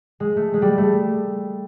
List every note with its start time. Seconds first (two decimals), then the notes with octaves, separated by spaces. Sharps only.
0.20 G#3
0.36 A3
0.54 G#3
0.62 G3
0.78 A3